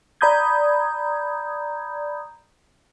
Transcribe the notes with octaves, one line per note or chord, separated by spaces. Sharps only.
D5 A#5 B5 D#6 G6 G#6